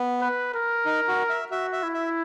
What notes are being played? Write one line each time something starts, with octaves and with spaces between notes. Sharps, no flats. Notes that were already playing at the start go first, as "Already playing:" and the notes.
Already playing: B3
B4
A#4
D#4
F#4
E5
F#4 E5
E5
E4
E5